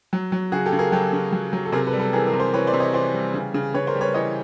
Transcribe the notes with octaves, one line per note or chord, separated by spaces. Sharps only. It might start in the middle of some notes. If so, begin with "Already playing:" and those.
F#3
F#3
C#3 F#4 G#4
G4 A4
C#3
G#4 A#4
F#3 G4 A4
C#3
F#3
F#3
A4
C3 G#4 A#4
A4 B4
G3
A4 B4
E3 G#4 A#4
G#4 A#4
C3
A#4 C5
E3 B4 C#5
C5 D5
C3
C#5 D#5
E3 C5 D5
G3
C#3
C#3
C#3 B4 C#5
A#4 C5
G3
B4 C#5
E3 C#5 D#5